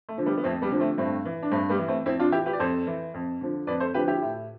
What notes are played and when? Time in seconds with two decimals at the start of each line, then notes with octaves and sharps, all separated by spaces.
0.09 A3
0.18 D3 F3
0.26 G3 B3
0.37 B3
0.44 F2 A3 C4
0.62 G3 B3
0.71 D3 F3
0.80 A3 C4
0.98 G2 A3 C4
1.25 E3
1.43 D4
1.51 G2 A3 C4
1.69 G3 B3
1.79 E3
1.88 A3 C4
2.06 F2 C4 E4
2.19 D4 F4
2.32 E3 E4 G4
2.46 G4 B4
2.53 D5
2.59 F2 A4 C5
2.87 E3
3.14 F2
3.41 D3 F3
3.67 F2 B4 D5
3.80 A4 C5
3.94 D3 F3 G4 B4
4.07 E4 G4
4.22 A2